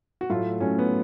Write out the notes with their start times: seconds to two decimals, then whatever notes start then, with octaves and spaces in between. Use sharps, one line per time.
0.21 F#4
0.30 A2 F#3 A3 F4
0.60 A2 F#3 A3 C#4
0.79 B3